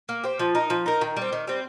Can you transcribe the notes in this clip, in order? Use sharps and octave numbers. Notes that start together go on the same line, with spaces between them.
A#3
G4 C5
F3
D#4 A#4
F3
D#4 A#4
D#3
G3 C4
D#3
G3 C4